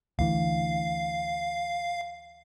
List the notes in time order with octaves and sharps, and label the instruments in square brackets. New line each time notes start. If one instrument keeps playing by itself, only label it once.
[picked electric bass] D2 E3 [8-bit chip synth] F5